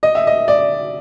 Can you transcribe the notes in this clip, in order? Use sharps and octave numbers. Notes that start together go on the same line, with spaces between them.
D#5
E5
D#5
D5